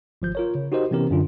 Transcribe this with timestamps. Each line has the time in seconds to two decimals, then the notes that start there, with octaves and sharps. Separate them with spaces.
0.22 G#1 F3 G6
0.35 F4 A#4 C#5
0.55 C#3
0.72 D#4 F#4 G4 A#4 C5 D#5
0.91 C3 E3 B3 C#4 G4 A#4
1.11 F#2 D3 D4 F4